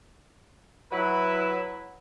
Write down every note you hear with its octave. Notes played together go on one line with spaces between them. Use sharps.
F#3 E4 B4